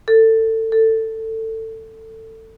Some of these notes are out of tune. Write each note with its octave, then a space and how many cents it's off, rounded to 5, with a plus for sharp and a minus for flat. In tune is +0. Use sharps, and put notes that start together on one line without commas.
A4 +25
A4 +20